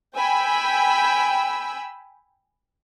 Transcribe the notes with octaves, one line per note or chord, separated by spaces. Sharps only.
G5 G#5 B5 E6